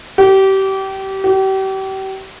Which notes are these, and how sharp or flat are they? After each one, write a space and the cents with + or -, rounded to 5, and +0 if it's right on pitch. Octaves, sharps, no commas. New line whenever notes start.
G4 -25
G4 -35